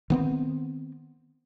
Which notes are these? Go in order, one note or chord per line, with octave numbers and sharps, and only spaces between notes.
D#3 B3 C4